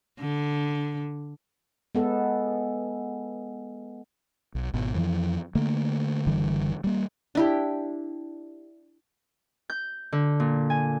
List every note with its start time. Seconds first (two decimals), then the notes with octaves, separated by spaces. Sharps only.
0.20 D3
1.95 G#3 B3 A4
4.55 B1
4.74 G#1 B2
4.94 F2 E3 F3
5.55 D3 A3 A#3
6.27 F#1 D3 E3 G3
6.84 G3 A#3
7.35 D4 E4 G4
9.70 G6
10.12 D3
10.40 A#2
10.70 G#5